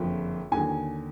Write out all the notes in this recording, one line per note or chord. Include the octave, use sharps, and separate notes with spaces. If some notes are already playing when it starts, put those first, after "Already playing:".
Already playing: F#1 F2 D3 F3
D#2 D3 F#3 G#5